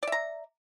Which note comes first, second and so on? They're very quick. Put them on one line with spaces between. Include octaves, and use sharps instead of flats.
D5 E5 A#5